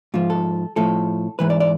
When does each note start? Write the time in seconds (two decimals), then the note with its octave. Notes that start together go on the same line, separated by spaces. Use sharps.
0.14 G#2 F3 F4
0.30 A4
0.76 A2 F3 A4
1.39 G#2 E3 B4
1.50 D5
1.60 D5